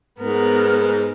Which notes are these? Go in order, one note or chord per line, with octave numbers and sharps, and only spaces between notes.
G#2 B3 A#4